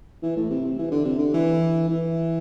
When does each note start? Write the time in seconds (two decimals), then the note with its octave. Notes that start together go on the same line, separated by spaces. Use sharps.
0.22 E3
0.36 A2
0.50 C3
0.65 C3
0.79 E3
0.91 D3
1.05 C3
1.19 D3
1.34 E3
1.88 E3